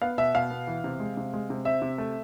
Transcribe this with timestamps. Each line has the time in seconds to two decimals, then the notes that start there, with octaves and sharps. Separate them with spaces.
0.02 B3 F5
0.18 B2 E5
0.35 B2 F5
0.50 B3
0.67 E3
0.84 C3
1.00 G#3
1.17 C3
1.33 G#3
1.50 C3
1.65 C4 E5
1.82 C3
1.98 A3